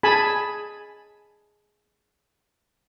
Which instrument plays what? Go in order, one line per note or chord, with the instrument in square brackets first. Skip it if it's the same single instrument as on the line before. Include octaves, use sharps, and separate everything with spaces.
[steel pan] G#4 G#5 A5 B5